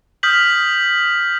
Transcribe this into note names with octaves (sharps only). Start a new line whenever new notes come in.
D#6 F6 G6 B6 F#7